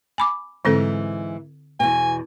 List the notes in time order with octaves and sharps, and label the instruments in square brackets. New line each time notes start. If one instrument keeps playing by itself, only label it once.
[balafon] G#5 B5 D6
[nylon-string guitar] G#2 E3 [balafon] D3 C4 A4
[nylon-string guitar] E2 B2 [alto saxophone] G#5